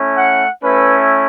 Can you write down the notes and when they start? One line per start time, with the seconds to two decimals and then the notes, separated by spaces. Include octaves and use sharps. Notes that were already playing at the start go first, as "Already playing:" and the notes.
Already playing: A3 C#4 E4
0.16 F#5
0.63 A3 C#4 E4 B4